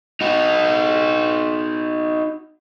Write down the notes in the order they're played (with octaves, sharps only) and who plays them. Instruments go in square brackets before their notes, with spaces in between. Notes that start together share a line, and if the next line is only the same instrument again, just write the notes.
[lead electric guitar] D#4 F#4